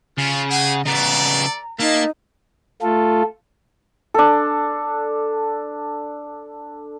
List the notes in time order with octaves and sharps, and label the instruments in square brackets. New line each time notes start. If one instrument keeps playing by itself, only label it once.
[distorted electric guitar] C#3 [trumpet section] F4
[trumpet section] G4 G#4 [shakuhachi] F#5
[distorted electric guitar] C#3 B3 [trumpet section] A4 D5 [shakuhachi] A#5
[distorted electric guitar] A#3 [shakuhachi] D#4 [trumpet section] F4 E5 A5
[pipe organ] A3 F4 A4
[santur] D4 A4